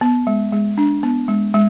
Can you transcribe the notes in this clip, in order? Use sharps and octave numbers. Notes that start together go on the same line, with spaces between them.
B3
G#3
G#3
D4
B3
G#3
G#3